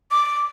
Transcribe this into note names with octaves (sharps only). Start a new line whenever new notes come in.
D6